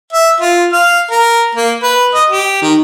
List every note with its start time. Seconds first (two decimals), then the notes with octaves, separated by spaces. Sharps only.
0.13 E5
0.41 F4
0.73 F5
1.11 A#4
1.56 A#3
1.83 B4
2.15 D#5
2.30 G4
2.62 D#3